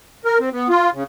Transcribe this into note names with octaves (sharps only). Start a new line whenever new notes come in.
A#4
C4
B3
F4
C#3